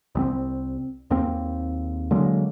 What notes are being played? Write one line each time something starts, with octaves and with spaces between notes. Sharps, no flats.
C2 G3 C4
D#2 A#3 C4
D3 F#3 G#3 A#3